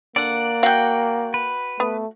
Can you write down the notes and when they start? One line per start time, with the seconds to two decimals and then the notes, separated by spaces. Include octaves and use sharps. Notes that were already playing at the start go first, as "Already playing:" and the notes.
0.16 D3 A#3 D5 F#5
0.63 F#4 F5 G5
1.34 B4
1.80 A3 B3